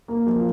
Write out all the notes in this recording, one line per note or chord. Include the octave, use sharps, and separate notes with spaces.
A#3 A#4
F3 F4